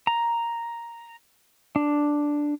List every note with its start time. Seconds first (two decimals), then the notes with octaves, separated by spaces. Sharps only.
0.07 A#5
1.76 D4